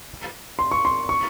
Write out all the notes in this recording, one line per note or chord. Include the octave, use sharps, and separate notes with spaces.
C6
C#6
C6
C#6